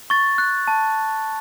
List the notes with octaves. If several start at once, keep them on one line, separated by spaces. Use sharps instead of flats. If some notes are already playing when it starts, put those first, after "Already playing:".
C#6 A6
F#6
A5